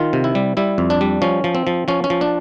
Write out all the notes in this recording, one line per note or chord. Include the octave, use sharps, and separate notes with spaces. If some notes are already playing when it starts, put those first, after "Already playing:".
Already playing: D#3 F4
C3
E4
G3
G3 E4
F2
D4
G3
F3 C#4
F3
C4
F3
F3 C#4
C#4
F3
D4